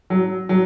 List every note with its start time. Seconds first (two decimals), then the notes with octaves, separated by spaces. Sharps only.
0.10 F#3
0.49 F#3